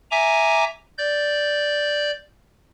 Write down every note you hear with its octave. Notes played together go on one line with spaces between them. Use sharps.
E5 G#5 A#5 D6
D5 G6